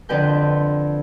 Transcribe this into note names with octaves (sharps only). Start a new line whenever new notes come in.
F2 D3 B4 G5 G6